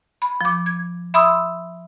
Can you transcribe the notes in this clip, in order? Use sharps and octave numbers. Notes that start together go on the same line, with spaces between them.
B5
F3 D6
G#6
E5 B5 C6 D#6 E6